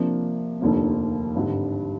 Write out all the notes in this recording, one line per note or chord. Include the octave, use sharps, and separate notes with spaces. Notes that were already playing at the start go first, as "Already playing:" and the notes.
Already playing: C3 F3 A#3 D4
F1 D#2 D3 F3 A#3
G#1 G2 D3 G3